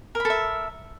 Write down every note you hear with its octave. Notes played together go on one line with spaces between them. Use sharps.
A4 A#4 E5 B5